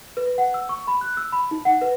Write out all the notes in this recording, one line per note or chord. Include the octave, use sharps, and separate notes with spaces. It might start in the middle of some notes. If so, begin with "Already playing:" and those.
B4
F#5
E6
C#6
B5
F#6
E6
B5
D#4
F#5
B4